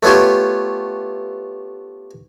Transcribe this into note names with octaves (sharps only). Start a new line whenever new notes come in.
A3 B3 C#4 F4 G4